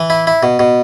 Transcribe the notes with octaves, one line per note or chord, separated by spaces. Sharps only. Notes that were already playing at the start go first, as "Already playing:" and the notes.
Already playing: E3
E4
E4
B2
B2